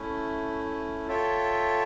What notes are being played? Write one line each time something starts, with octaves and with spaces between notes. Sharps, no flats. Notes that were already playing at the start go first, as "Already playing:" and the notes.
Already playing: A3 C#4 E4
F4 A4 C#5 E5 G5